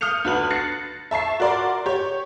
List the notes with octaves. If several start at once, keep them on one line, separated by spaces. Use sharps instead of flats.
D#6 F6 G6 C#7 F7
D2 F#4 B4 F#7
F#6 A6 A#6 C7 C#7
E5 A5 C#6 C7
F#4 A#4 D5 C6
G4 C#5